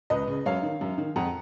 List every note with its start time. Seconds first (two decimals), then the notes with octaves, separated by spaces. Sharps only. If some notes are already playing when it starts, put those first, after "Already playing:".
0.10 C#2 B4 D#5
0.28 C#3
0.46 F#2 C#5 F5
0.63 D#3
0.81 F#2
0.98 D#3
1.16 F2 F#5 A#5